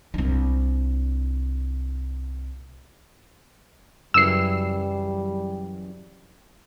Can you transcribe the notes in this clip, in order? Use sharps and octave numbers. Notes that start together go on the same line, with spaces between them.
C2 D4
F#2 C#3 E3 G3 E6 C7